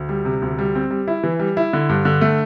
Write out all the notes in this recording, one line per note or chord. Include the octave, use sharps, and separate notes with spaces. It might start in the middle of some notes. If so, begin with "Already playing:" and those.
Already playing: D2
G3
C3
D2
G3
C4
G3
E4
E3
G3
E4
D3
G2
D3
A3